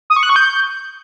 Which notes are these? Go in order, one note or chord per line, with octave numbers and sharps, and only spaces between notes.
D#6
C#6
F#6
C#6
G6